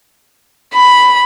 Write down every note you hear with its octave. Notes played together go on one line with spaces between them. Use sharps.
B5